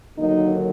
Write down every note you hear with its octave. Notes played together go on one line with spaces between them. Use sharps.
D#2 D3 F#3 A#3 D#4